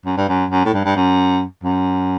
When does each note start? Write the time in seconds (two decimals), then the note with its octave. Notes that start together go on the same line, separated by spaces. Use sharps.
0.05 F#2
0.17 G2
0.29 F#2
0.51 F#2
0.65 A2
0.73 G2
0.85 G2
0.96 F#2
1.63 F#2